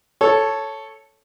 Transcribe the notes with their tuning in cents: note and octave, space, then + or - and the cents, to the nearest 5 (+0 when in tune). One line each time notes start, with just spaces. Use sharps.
A4 +0 C#5 +0